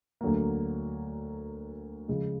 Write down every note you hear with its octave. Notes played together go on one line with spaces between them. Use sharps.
D2 D3 F#3 A#3
C#3 F3 G#3